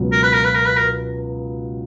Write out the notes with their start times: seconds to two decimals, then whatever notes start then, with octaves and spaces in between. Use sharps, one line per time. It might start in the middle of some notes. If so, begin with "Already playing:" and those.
Already playing: C#2 B2 F#3
0.12 A#4
0.23 B4
0.33 A#4
0.44 B4
0.55 A#4
0.66 B4
0.77 A#4